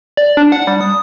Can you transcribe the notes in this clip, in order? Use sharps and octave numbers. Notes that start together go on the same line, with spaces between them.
D5
D4
F#5
G3
D#6